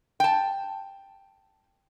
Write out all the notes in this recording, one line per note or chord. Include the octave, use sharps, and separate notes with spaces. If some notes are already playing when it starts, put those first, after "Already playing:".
G5 A5